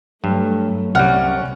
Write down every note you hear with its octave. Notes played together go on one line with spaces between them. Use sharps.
G2 F#3 A3
C2 G3 C#4 F#5 F6